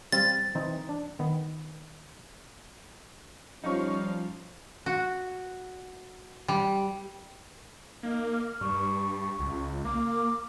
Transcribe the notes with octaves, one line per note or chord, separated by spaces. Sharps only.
G3 C4 F5 A6
E3 C4 D#4
D4
D#3 B3
F3 G3 C#4 D#4 F4 F5 C#6
F#4
G3
A#3 D#4
F6
G2 C#6
C#2
A#3 D6